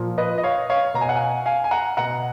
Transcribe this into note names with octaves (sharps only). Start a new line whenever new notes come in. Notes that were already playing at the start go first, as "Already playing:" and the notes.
Already playing: A#2 F3
B4 D#5
D#5
C#5 F5
C#5 F5
B2 A#5
G#5
F#5
F5 G#5
F5 G#5
G#5
F#5 A#5
B2 F#5 A#5